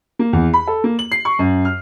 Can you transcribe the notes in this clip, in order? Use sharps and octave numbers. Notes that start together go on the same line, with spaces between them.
A#3
E2
B5
A4
A#3
F#7
C7
C#6
F#2
F6